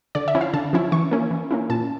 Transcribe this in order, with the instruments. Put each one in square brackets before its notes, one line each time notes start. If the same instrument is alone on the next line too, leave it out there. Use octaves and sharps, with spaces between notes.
[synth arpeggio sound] D3 D5
E5
F3 C#4 E4
F5
D3 A5
F3 C#4 E4
E3 C#6
A#3 C#4 E4
E3
A#3 C#4 E4
A#2 A5